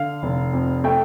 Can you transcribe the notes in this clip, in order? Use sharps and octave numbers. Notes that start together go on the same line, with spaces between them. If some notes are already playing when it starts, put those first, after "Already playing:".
Already playing: D3 F5
F1
F2
A3 G5